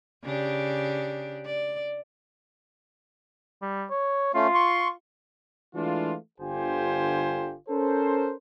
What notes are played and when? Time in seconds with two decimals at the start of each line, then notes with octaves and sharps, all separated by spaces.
0.24 C#3 D4 G4
1.46 D5
3.62 G3
3.90 C#5
4.34 A3 C#4 F4
4.54 C6 C#6
5.75 E3 G#3 A3 D4 F4
6.40 G1 D3 F4 G4 C5 G#5
7.69 C#4 A4 A#4 C5